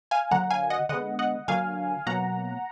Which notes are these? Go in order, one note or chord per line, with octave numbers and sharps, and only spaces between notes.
F5 G#5
D3 F#3 A#3 F#5 A#5
F5 G#5
D#5 F#5
D3 G#3 B3 D#5 F#5
D#5 F#5
D3 F#3 A#3 F5 G#5
B2 F#3 A#3 F#5 A#5